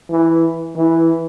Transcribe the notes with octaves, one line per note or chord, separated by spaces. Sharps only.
E3
E3